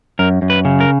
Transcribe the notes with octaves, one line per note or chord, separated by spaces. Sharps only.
F#2 A#4
F#2
B4
C#3
A#4